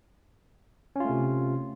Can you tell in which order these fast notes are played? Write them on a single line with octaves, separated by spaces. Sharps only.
C#4 F4 A3 C3